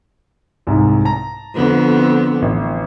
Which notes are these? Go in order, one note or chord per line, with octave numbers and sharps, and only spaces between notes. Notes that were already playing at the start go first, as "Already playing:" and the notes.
C2 G#2
A5 A#5
F2 D3 B3
C4
A1